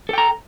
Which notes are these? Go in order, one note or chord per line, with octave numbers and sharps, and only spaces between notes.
A4 G5 A#5